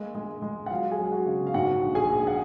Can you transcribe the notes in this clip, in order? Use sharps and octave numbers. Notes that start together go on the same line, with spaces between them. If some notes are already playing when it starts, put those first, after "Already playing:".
Already playing: G#3 A#3
G#3
G#3
F#5
F#3 F4 F5
G#4 G#5
F#3
F#4 F#5
C#3
F5
G#2 F#4 F#5
A#1
G#4 G#5
A#1
F#5